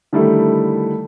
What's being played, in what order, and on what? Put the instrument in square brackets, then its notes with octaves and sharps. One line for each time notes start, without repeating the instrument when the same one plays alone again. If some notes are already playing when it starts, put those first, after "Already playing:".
[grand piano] D3 D#3 G3 A3 E4 A4